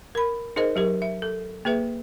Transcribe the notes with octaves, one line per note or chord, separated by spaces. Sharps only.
A#4 B5
D#4 G#4 A#4 C5 D#5
F#3 G4 A#4
E5
A4
A#3 G#4 B4 E5